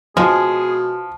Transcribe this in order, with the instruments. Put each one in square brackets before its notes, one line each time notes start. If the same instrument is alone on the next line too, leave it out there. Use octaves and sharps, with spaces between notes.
[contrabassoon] B2 [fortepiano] F3 [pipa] G#3 [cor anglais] G#4